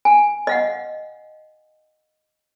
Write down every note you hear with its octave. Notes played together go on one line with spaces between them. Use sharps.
G#5
D#5 F5 F#5